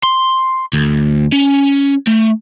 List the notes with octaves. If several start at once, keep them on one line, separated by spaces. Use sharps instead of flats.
C6
D2
C#4
A3